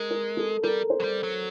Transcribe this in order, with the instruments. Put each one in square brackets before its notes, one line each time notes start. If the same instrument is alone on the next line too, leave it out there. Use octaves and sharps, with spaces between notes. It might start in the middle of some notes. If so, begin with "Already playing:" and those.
Already playing: [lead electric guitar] G#3 [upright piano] A#4
[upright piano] A#4
A4
[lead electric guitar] G3 [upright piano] A#4
[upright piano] C5
[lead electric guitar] F#3
G3
F#3